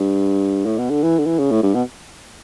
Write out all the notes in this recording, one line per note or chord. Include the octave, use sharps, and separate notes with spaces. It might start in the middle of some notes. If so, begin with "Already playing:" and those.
Already playing: G2
A2
B2
D3
E3
D3
E3
C#3
A2
G2
B2